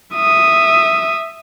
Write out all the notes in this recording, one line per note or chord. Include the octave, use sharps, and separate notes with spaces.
E5 D#6